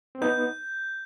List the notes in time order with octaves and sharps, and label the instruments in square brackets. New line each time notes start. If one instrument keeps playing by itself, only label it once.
[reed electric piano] C4
[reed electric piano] B3 D#4 [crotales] G6